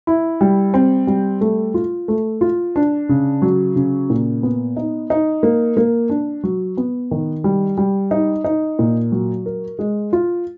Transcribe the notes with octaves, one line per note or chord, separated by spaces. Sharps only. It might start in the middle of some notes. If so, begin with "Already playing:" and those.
E4
G3
C4
G3
A3
F4
A3
F4
D4
C#3
F#3
C#3
A#2
B3
D#4
D#4
A#3
A#3
D4
F#3
B3
D#3
G3
G3
D#4
D#4
A#2
F#3
A#4
G#3
F4